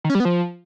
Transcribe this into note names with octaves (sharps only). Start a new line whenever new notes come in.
D#3
C#4
G3
B3
F3